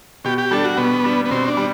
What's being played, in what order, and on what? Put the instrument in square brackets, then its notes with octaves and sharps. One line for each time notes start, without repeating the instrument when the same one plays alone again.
[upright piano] B2 [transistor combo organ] G4
[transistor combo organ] G4
[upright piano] G3 D4 [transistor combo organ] A4
[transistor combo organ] F#4
[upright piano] B2 [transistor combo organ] B3
[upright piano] G3 D4
[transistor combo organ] B3
[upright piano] B2 [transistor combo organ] C4
[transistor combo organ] D4
[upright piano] G3